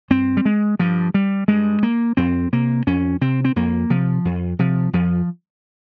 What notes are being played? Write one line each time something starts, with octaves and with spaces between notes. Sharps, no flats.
G2 C4
G3
G#3
G2 F3
G3
G2 G#3
A#3
F2 C4
C3 A#3
F2 C#4
C3 C4
C4
F2 A#3
C3 F3
F2
C3 F3
F2 F3